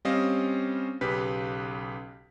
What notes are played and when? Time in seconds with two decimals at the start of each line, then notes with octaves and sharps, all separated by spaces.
0.05 G3 C4 C#4 D#5 F5
1.01 B1 C#3 G4 B4 B6